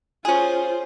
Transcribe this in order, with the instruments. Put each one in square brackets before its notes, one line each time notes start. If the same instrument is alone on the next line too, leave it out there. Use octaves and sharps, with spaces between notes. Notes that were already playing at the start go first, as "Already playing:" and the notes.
[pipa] C#4 G#4 [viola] F4 C5